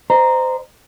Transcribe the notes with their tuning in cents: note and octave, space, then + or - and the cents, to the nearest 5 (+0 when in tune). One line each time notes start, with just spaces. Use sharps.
C5 -25 D#5 -35 A#5 +0